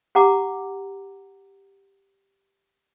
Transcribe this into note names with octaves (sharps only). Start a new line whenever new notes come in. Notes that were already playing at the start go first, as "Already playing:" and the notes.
G4 F#5 A#5 D6